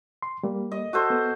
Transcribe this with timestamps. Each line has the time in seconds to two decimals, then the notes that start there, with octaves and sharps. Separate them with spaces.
0.22 C6
0.43 G3 A#3
0.72 D#5
0.93 F#4 A4 C5
1.10 B3